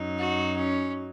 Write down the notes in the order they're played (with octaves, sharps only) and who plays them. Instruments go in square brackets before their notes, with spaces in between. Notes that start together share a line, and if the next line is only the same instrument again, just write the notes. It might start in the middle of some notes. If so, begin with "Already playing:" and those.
Already playing: [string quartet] F#2 F#3 D#4
[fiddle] F#4
C#4